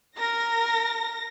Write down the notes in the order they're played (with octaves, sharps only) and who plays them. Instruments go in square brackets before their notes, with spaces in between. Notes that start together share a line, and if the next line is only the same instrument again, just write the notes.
[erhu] A#4 [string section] A#6